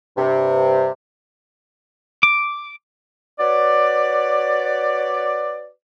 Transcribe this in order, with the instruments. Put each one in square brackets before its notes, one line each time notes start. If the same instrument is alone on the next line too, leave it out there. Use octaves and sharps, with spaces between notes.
[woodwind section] G2 C3
[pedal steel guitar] D6
[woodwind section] F#4 B4 C#5 D5